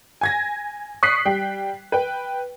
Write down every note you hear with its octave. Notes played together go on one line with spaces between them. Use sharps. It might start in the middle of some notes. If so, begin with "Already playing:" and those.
G#5 G#6 A#6
C#6 D#6 F#6 B6 C7
G3 G5
B4 G5